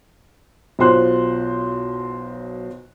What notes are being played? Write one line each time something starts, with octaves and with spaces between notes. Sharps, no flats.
B1 B2 F4 C5 C6 F#6